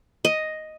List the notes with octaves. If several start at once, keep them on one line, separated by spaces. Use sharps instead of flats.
D#5